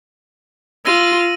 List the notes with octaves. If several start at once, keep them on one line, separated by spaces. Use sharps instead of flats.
F4 E6 A#6 D#7